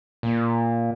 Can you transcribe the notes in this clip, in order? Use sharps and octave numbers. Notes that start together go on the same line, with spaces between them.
A#2